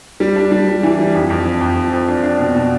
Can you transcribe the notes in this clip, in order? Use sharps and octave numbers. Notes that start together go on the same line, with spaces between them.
G3
D4
G3
G3
E3
G3
F2
F2
F3
F2
F3
F2
D4
D4
B2
B2